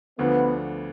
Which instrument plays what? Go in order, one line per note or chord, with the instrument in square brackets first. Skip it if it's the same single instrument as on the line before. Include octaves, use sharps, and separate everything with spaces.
[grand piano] D2 D3 F3 [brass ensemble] B3